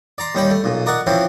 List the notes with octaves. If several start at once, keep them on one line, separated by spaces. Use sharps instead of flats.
D5 A#5 C6
D#2 G3 C#4 G5 B5
A3
B1 A#2
A#4 D5 D#5 F#5 C#6
E3 F3 C4 C#4 E4